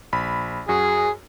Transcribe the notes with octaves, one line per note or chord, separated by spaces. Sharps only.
A#1 B5
F#2 F#4 G#4